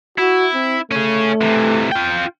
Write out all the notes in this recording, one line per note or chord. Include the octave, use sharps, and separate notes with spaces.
E4 F#4
C4
A3 C#4 G#4
C3 E3
F4 G5